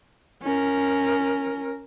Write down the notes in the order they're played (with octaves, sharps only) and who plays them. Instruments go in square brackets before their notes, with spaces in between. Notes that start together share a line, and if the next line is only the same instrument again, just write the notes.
[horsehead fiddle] C#4 A#4